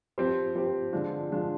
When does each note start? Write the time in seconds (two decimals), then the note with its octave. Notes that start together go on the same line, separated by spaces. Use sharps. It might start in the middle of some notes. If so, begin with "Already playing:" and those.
0.18 F3 C4 G4 C5
0.55 F3 C4 G4 C5
0.93 D3 F3 G#3 D4 F4
1.30 D3 F3 G#3 D4 F4